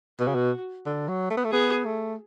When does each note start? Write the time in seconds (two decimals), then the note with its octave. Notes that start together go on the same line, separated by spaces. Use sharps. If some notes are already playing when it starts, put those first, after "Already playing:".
0.20 B2 F#4
0.28 C#3
0.35 B2
0.86 D3
1.08 F#3
1.30 A3
1.37 B3
1.45 A3
1.52 B3 G#4
1.85 A3